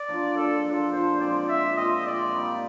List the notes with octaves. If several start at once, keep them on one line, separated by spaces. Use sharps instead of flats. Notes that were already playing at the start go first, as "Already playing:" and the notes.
Already playing: D5
F3 A#3 D4
C#3 A4
F3 A#3 D4
A#2 C5
F3 G#3 C4 D5
A#2 E5
F3 G#3 C4 D#5
A#2 D5
G3 A#3 D#4